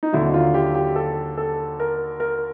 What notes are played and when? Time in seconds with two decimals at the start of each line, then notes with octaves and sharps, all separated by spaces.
0.03 D#4
0.12 D#2 D3 F#3 E4
0.34 F4
0.54 G4
0.75 G4
0.96 A4
1.37 A4
1.80 A#4
2.20 A#4